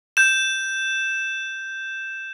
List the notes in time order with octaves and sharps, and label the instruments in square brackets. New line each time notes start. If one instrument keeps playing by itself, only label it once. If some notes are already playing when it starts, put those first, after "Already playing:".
[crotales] G6 E7